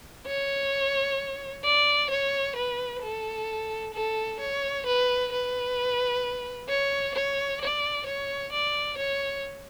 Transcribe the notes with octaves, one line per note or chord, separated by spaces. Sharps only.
C#5
D5
C#5
B4
A4
A4
C#5
B4
B4
C#5
C#5
D5
C#5
D5
C#5